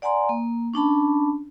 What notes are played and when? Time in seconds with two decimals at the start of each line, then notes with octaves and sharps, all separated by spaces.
0.02 D5 F#5 G#5 A#5 C6
0.29 A#3
0.74 C#4 D4 A5 B5